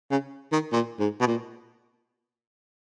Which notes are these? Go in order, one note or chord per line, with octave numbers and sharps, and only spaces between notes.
C#3
D#3
A#2
G#2
B2
A#2